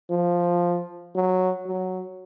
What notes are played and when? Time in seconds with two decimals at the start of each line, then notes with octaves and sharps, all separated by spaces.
0.10 F3
1.15 F#3
1.67 F#3